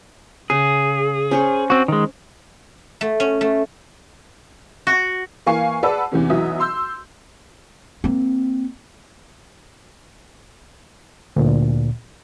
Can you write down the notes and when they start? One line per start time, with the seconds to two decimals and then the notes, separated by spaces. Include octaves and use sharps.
0.50 C#3 G#4
1.31 C#4 C5 C#5
1.70 C4 F#4
1.88 D#3 G#3
3.01 A3
3.20 C#4
3.41 A3
4.87 F#4
5.46 E3 A#3 F5 G#5 C#6 C7
5.83 G#4 B4 D5 F#5 A5 E6
6.12 E2 C3 E3 C#4
6.30 B1 E3 F#3 E5 D#6
6.60 C6 E6 G6
8.04 A#3 C4
11.36 D2 A#2